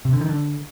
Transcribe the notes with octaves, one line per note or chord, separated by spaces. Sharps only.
C3
D3
D#3
D3